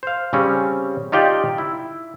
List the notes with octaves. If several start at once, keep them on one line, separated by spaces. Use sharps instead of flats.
C5 F5
C#3 G3 C4 C#4
D#4 F4 G4 D5 G5
E4